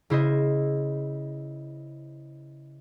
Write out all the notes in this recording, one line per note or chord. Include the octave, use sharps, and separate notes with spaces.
C#3 E4 C5 D#5